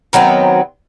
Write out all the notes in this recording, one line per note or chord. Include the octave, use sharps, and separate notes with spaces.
D#3 F#3 B3 C4